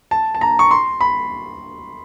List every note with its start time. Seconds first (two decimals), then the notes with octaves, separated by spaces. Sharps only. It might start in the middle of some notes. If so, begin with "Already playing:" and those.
0.11 A5
0.34 A5
0.41 A#5
0.59 C#6
0.71 C6
1.01 B5